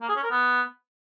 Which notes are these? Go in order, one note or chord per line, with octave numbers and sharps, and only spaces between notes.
A#3
G#4
C#4
A#4
B3